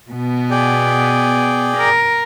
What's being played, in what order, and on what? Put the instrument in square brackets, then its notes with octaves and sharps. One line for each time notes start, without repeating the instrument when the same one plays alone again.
[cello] B2 B3
[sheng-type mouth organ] G#4 D5 G5
[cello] A#4